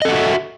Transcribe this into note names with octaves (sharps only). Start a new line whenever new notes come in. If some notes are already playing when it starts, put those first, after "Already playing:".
F#4 A4 D#5 E5 F#5